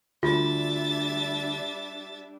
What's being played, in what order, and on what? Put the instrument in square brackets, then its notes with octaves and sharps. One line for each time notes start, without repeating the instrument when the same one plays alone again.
[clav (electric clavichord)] D2 [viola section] G3 D4 [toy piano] F4 [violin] E5 A6